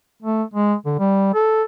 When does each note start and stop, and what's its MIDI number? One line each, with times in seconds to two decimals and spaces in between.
0.23 0.43 57
0.54 0.74 56
0.86 0.95 50
0.99 1.30 55
1.34 1.63 69